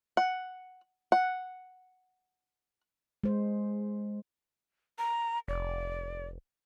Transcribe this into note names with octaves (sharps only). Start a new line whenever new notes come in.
F#5
F#5
G#3 C5
A#5
F1 D5